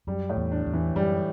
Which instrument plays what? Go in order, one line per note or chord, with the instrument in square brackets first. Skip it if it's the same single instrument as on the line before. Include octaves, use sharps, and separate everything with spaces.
[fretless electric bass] F#2 [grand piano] G3
[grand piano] A2
[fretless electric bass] E2
[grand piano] D4
[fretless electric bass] E2
[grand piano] E3
[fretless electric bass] F#2 [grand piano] G3